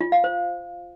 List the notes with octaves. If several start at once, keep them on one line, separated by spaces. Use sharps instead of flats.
F4
F5
C5